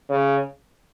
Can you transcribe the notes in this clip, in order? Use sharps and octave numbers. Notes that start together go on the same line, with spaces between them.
C#3